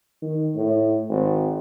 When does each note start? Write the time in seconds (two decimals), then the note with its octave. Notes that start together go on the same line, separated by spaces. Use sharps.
0.22 D#3
0.55 A2
1.09 G#1